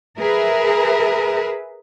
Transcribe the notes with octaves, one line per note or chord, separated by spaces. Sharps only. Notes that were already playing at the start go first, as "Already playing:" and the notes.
G#4 A#4 B4 E5